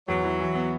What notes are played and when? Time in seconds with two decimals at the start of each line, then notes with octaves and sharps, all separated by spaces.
0.08 E2 F#3
0.24 E3
0.40 E3
0.55 B3